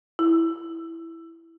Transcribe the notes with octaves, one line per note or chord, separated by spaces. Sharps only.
E4